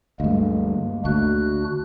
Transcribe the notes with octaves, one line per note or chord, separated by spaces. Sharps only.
D2 G2 G#3 A#3
D2 D4 F#4 F#6